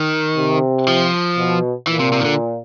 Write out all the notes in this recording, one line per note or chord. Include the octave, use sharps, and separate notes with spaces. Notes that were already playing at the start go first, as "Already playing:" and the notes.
Already playing: D#3
C3
F3
B2
A#2 E3
C3
C3
D#3
D3